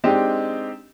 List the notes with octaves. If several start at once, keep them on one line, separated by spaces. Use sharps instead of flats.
G#3 C4 D4 D#4 G4 D#5